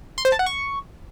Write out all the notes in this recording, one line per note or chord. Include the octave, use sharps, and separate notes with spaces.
C6
C5
A5
F#5
C#6